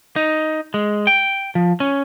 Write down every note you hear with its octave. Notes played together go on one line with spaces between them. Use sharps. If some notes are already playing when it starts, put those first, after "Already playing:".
D#4
G#3
G5
F3
C#4